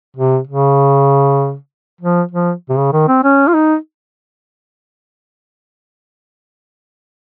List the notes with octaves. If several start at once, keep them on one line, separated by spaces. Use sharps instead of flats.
C3
C#3
F3
F3
C3
C#3
D#3
C4
C#4
F4
D#4